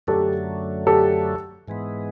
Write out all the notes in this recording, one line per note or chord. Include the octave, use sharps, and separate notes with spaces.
F#2 D3 F#3 A3 G4 A4
G4 A4
G#2 E3 G#3 B3